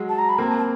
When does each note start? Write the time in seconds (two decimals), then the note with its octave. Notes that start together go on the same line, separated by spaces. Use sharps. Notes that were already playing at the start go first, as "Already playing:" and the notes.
Already playing: F#3 G#3
0.09 A5
0.18 A#5
0.29 B5
0.38 A#3 C4 A#5
0.48 A5
0.59 A5